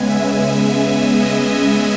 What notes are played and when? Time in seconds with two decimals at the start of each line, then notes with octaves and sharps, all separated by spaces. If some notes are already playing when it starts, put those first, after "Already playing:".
Already playing: C#3 G#3 B3 G#5
0.10 E5
1.22 D#5